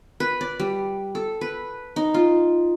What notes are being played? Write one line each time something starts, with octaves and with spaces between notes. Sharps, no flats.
B4
D5
G3
A4
B4
D#4
F4